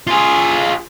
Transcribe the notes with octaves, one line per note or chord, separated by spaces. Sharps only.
F4 G#4